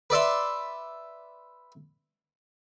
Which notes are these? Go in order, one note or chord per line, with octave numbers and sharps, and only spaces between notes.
B4 D5 E5 C6